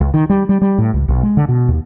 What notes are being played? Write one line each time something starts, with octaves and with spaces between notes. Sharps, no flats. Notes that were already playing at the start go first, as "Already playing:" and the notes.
C#2
D#3
G3
G3
G3
A2
C#2
B1
G#3
D3
B2
D#2